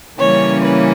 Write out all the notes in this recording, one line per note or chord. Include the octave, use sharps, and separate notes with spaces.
C#3 E3 G3 A#3 C#4 C#5
B4